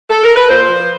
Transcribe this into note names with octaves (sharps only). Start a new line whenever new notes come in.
A4
A#4
B4
A#2 C5
F3